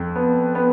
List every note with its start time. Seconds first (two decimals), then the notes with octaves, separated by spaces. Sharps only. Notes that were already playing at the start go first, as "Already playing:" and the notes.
Already playing: F2
0.15 B3
0.55 B3